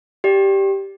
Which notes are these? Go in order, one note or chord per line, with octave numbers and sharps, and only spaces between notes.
G4 D5